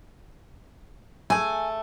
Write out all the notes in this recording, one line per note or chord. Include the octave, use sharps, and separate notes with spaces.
A3 G#4 G#5